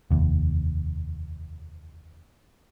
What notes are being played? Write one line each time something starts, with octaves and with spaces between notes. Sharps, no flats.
F1 D#2